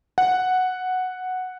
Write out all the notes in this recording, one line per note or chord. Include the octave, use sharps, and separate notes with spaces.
F#5